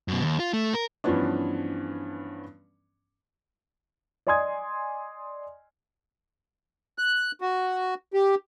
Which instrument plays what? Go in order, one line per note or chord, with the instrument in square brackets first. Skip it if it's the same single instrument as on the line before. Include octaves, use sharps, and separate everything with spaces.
[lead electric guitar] F#2 B2
D#2
F4
A3
A#4
[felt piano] G2 E3 F3 B3 C#4 D4
[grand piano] D5 D#5 G#5 C6 D#6 G#6
[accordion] F#6
F#4
G4